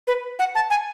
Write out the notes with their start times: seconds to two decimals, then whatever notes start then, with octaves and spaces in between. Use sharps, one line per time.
0.07 B4
0.39 F#5
0.55 A5
0.70 G#5